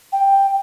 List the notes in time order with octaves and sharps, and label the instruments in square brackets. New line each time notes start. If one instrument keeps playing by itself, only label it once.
[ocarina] G5